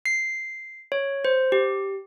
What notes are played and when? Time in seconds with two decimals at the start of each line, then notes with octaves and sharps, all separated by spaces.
0.06 C7
0.92 C#5
1.25 C5
1.52 G4